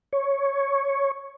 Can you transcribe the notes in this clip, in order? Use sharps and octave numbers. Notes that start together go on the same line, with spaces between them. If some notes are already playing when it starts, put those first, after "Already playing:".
C#5